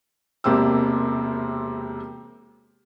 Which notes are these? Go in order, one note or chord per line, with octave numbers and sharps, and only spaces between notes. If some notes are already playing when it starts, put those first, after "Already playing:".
E1 C3 A#3 C4 G4 E6